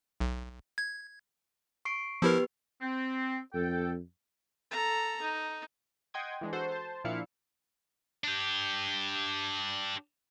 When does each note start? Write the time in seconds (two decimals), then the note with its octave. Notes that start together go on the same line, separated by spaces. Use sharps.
0.20 B1
0.78 G#6
1.85 C#6 C7 D7
2.22 F3 B3 E4 G4 A#4 B4
2.81 C4
3.54 F2 A4 G5
4.71 A4 A#5
5.21 D#4
6.14 D#5 F#5 G5 C6 D#6 G#6
6.41 E3 G#3 D4
6.53 F#4 A4 C5 F#5
6.71 C5 A5
7.04 A#2 F3 D4 E4 F5 C#7
8.24 D4 G4